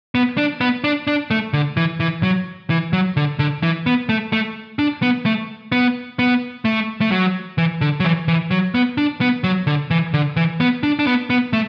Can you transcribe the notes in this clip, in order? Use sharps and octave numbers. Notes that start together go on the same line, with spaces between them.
B3
D4
B3
D4
D4
A3
D3
E3
E3
F#3
E3
F#3
D3
D3
E3
B3
A3
A3
D4
B3
A3
B3
B3
A3
A3
F#3
E3
D3
F#3
E3
E3
F#3
B3
D4
B3
F#3
D3
E3
D3
E3
B3
D4
D4
B3
B3
A3